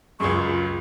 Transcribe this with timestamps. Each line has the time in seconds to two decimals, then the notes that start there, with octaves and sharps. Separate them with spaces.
0.20 C#2 F#2 G#4 C6 C#6
0.34 F4